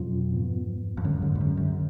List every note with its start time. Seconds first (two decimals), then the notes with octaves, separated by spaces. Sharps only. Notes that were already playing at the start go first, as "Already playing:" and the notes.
Already playing: F2 B2 F#3 C#4 F4
0.34 G#2 F3 B3
0.97 F2
1.05 F#2 D3 G#3 C#4
1.22 G#2
1.35 F2
1.41 F#2
1.57 F#2